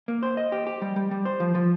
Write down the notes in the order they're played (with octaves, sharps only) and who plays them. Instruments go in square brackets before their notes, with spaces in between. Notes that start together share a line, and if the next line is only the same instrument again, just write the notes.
[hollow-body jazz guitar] A#3
C5
D#5
G4
G4
G3
G3
G3
C5
F3
F3